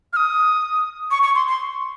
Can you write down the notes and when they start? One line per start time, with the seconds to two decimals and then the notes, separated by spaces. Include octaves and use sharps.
0.13 F6
0.17 D#6
1.11 C#6
1.23 C#6
1.35 C6
1.47 C6